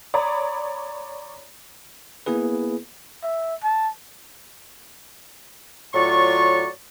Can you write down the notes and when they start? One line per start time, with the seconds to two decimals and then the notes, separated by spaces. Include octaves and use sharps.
0.14 C#5 D5 A#5 B5 D#6
2.26 A#3 B3 E4 G#4 B4
3.23 E5
3.64 A5
5.94 A2 F#3 F4 D5 C#6